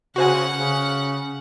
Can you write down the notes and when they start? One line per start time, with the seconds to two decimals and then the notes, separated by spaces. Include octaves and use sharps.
0.16 C#3 F#4 C5 F#5 G#5 F#6
0.56 C#3